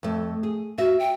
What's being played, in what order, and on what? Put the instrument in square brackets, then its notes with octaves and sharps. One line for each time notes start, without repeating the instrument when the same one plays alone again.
[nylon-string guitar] F2 A3
G#4
[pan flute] F#4 [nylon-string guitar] E5
[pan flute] G5